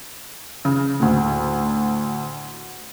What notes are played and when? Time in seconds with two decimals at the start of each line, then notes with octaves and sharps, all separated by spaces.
0.65 C#3
1.00 D2 A2